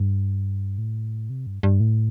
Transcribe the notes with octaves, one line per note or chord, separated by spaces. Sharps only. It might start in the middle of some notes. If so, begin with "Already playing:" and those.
Already playing: G2
A2
C3
G2
G2
A2